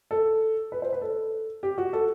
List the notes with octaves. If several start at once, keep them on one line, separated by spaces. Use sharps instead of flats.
A4
B4
C5
B4
A4
G4
F#4
A4